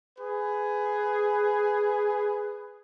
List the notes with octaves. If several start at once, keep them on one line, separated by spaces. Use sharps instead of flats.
G#4 B4